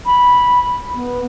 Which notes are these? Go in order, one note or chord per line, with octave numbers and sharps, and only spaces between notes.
B5
B3